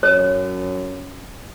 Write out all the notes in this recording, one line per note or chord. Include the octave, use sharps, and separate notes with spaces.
F#2 C#5